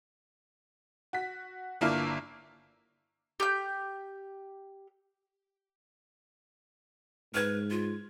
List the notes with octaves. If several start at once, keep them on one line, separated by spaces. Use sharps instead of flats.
F#4 B6
G1 A#3 D4 E4 F4 F6
G4 G6
G#2 B4 F6 G#6
F4